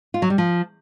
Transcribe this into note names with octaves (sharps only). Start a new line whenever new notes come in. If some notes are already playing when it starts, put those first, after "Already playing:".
F4
F#3
G3
F3